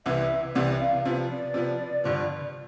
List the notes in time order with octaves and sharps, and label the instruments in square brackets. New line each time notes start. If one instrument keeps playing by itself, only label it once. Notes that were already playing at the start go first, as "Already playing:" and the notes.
[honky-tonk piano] C2 C3 E3 B3 [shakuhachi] E5
[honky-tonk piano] C2 C3 E3 B3 [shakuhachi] D5
[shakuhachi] F5
[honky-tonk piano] C3 F3 B3
[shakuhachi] D5
[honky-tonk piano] C3 F3 B3
G2 D3 F3